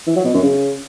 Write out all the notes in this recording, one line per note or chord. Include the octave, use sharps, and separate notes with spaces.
E3
F#3
B2
F#2
C#3